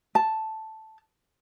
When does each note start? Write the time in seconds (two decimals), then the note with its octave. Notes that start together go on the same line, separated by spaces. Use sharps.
0.15 A5